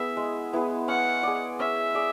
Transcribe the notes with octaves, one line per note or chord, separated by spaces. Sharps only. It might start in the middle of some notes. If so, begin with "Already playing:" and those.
Already playing: B3 E4 G#4 E5
G#3
B3 E4 G#4
C#4 F#5
G#4 D5
C#4 E5
G#4 D5